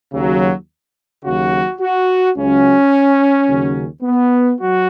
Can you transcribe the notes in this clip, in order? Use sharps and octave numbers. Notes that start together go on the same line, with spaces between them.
D#2 C#3 F#3
D#2 C#3 F#3 F#4
F#4
C#2 C#3 F#3 C#4
D#2 C#3 F#3
B3
F#3 F#4